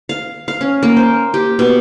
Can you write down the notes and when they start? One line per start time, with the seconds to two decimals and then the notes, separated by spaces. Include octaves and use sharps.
0.09 F5
0.48 F5
0.61 C#4
0.83 A#3
0.97 C5
1.34 G4
1.59 B2